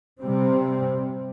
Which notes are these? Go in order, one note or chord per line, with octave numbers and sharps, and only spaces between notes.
C3 G3 C4